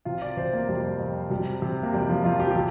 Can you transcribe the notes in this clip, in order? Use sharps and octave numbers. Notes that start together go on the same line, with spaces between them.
C3 F4
D5
C3 C5
A#3
F2 G3
F2
C3 G3
C3
A#3
F2 G3
F3
F2 F4
G4
G4
C3